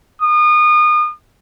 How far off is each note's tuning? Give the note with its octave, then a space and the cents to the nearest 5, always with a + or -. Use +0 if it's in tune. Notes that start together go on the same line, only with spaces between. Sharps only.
D#6 -35